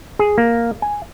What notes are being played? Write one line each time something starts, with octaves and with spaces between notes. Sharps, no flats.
G#4
A#3
G#5